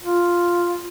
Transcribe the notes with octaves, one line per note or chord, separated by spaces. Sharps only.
F4